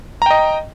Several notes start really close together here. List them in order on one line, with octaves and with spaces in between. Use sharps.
A#5 G5 D#5